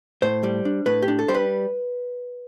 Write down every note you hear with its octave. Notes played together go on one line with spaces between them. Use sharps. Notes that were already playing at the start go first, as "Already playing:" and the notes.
A2 C5
G3
D4
A2 B4
G4
D4
A4
G3 C5
B4